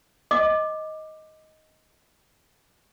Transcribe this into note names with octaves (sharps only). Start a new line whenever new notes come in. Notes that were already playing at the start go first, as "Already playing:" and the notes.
D#5 D6